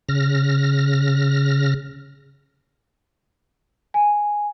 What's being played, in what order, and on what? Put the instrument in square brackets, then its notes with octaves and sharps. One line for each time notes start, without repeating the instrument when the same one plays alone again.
[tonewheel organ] C#3 F6 A#6
[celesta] G#5